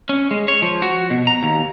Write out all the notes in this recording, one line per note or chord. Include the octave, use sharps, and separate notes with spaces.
C#4
G#3
C#5
F3
F#4
B2
A#5
D#2